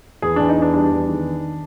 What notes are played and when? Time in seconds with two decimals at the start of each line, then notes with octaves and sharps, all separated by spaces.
0.22 E2 G#4
0.36 E2 D4
0.49 D#4
0.58 E2 D4
0.74 G3 D4
0.91 E2
1.09 D#3